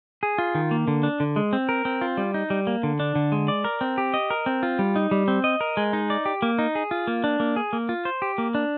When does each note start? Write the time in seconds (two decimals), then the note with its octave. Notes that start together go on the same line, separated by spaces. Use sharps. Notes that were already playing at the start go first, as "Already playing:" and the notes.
0.23 G#4
0.38 F4
0.55 D#3
0.71 A#3
0.88 D3
1.03 D4
1.20 D3
1.36 G#3
1.53 C4
1.69 A#4
1.85 C4
2.01 F4
2.17 G3
2.34 D#4
2.50 G3
2.67 A#3
2.83 D3
3.00 D4
3.15 D3
3.32 G#3
3.48 D5
3.64 A#4
3.81 C4
3.98 G4
4.14 D#5
4.30 A#4
4.46 C4
4.63 F4
4.79 G3
4.96 D#4
5.11 G3
5.28 C4
5.44 D#5
5.61 A#4
5.77 G#3
5.93 D#4
6.10 D5
6.26 G4
6.42 A#3
6.59 D#4
6.75 G#4
6.91 F4
7.07 A#3
7.24 D4
7.40 A#3
7.56 G#4
7.73 A#3
7.89 F4
8.05 C5
8.22 G4
8.38 A#3
8.55 D4